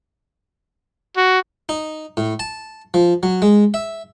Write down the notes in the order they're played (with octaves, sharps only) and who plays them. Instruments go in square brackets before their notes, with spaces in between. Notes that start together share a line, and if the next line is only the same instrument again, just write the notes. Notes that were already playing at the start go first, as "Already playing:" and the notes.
[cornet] F#4
[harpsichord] D#4
A2
A5
F3
F#3
G#3
E5